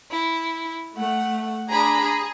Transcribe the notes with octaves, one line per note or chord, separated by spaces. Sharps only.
E4
A3 F#5
D4 G#4 A#5 B5
G#4